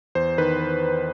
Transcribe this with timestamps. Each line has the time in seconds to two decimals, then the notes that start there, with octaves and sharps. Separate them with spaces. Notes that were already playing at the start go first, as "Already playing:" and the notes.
0.15 E2 C5
0.38 D#3 B4